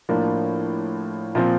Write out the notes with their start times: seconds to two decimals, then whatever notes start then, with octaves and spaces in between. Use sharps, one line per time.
0.09 A2 F3 A#3 D4
1.35 A#2 F3 C4